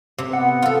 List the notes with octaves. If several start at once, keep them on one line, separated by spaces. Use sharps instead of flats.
C3
B3 F#5
F4 A4